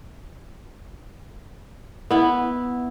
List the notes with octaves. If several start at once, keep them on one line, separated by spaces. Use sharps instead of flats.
B3 E4